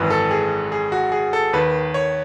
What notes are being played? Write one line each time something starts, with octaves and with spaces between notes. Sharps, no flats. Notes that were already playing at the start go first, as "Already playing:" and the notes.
Already playing: G#1 F#2 E3 B4
A4
G#4
G#4
F#4
G#4
A4
D#2 D#3 B4
C#5